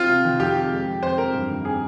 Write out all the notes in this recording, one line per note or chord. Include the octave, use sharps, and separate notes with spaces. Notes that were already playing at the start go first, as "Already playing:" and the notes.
Already playing: C4 F4
C3
D#3
F2 G4
F2
G#3
F2
F2 C5
F2 A#4
G2
D#3
C4 G#4